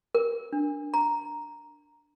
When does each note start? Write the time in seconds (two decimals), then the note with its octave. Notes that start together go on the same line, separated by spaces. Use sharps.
0.15 A#4
0.53 D4
0.94 A#5